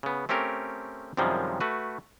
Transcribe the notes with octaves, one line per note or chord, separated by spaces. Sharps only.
C#3 B3
A3 C4 C#4 G4 A#4
F#2 C3 D#3 F3 G3 G#3
A3 F#4 B4